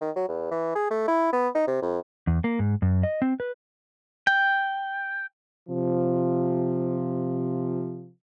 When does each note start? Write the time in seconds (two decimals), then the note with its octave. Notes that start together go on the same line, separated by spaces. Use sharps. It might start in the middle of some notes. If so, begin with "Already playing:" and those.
0.01 D#3
0.16 F#3
0.28 E2
0.51 E3
0.75 G#4
0.91 A3
1.08 E4
1.33 B3
1.55 D#4
1.67 C3
1.82 F2
2.27 E2
2.44 A#3
2.59 G#2
2.82 F#2
3.03 D#5
3.22 C4
3.40 B4
4.27 G5
5.69 C3 F3